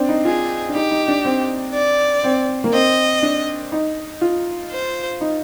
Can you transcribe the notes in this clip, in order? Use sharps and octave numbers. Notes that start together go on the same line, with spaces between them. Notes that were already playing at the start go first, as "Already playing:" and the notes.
Already playing: C4 D4
D#4
F4 G#4
D4
D#4 G4
D#4
D4
C4
D5
C4
A#3
C4 D#5
D4
D#4
F4
C5
D#4